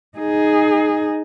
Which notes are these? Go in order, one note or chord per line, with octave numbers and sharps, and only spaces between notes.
D#4 G#4